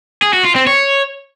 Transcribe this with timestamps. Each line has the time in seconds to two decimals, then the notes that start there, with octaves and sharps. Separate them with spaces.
0.22 G#4
0.33 F#4
0.44 F4
0.56 C4
0.67 C#5